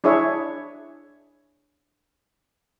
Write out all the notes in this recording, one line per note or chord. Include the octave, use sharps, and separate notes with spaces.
D4 E4 G#4 C#5 E5